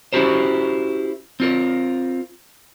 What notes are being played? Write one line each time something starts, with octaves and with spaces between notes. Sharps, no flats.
C#4 E4 F#4 G4 A#4 C5
C4 F4 A#4